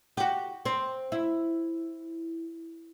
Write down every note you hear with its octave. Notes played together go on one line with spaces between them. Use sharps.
F#4 G4
C4
E4